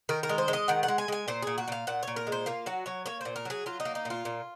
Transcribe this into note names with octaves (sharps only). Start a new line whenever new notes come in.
D#3 A#4
A#4
G#3
C5
G#3
D#5
D#3 F#5
F#5
G#3
G#5
G#3 G#5
A#2 C5
A#2 G#4
F#4
A#2 F5
A#2 F#5
A#2 C#5
A#4
G#3
C5
A#3 F4
F#3 F#4
F#3 C#5
A#3 C#5
A#2 C5
A#4
F#3 G#4
F#3 F4
D#4
A#3
D#4
A#2 F4
A#2